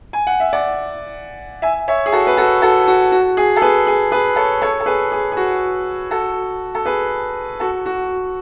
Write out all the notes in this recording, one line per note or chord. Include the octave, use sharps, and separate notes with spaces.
G#5
F#5
E5
D5 F#5
E5 G#5
C#5 E5
G#4
F#4 A4
B4
F#4 A4
F#4 A4
F#4
F#4
G#4
A4
G#4 B4
G#4
G#4 B4
A4 C#5
A4 C#5
A4
G#4 B4
G#4
G#4
F#4
F#4 A4
A4
G#4 B4
F#4 A4
F#4